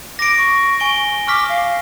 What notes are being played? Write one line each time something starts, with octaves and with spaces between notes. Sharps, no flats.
D6 A#6 D7
C#6
G#5 D7 G7
C#6 D6 F6 B6
F5